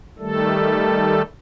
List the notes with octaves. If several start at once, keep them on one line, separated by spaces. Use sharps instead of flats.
D#3 G3 A3 A4